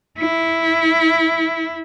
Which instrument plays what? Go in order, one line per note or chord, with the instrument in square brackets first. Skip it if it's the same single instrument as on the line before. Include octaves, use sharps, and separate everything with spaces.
[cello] E4